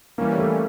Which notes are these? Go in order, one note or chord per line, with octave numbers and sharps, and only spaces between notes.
E3 G3 A#3 C#4
A3